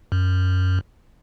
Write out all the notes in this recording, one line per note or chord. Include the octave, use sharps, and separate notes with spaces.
F#2